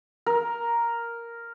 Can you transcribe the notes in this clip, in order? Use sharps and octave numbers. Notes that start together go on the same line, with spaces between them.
A#4